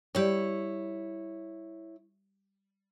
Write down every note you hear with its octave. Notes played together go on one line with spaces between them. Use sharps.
G3 E4 G4 C#5 D5